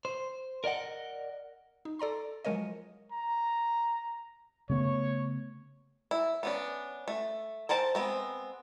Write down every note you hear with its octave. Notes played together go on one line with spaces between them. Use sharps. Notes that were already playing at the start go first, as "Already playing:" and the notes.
C5
A#4 D5 D#5 F#5
D#4
A4 D5 A#5 C6
F3 F#3 G#3 A#4 C#5 D#5
A#5
C#3 A3 B3 C#5
E4
B3 C#4 D4
A3
A4 A#4 C5 A5
G#3 B3 C4